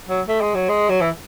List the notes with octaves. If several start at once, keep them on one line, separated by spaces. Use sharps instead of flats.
F#3
A3
G#3
F#3
G#3
F#3
E3